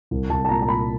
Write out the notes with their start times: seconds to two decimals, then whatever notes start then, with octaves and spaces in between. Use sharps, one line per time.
0.11 C2
0.30 C2 A5
0.45 A5
0.49 A#2 A#5
0.62 A#5
0.69 A#2 B5